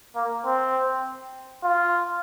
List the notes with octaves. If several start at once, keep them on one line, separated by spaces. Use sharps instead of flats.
A#3
C4
F4